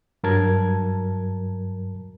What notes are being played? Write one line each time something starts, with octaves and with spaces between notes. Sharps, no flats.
G2 F#3 A#4 A5 G#6